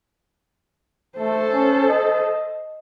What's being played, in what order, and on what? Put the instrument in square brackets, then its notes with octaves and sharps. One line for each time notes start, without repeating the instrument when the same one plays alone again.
[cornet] A3 [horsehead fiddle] A4 C5
[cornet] C#4
D#5